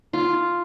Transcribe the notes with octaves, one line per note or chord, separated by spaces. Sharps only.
F4